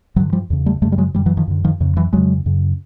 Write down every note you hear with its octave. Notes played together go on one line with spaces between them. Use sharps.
G2 D3 E3 F#3
F3 G3
E2 C#3
G3 A3
F#2 C#3 G3 A3
G3
F#3 G#3
F#2 D3 F3 G3
E3 F#3
D#3 F3
F#2 D3
D#3 F3
F2 C#3
E3 F#3
F2 C#3 F#3 G#3
F#2 C#3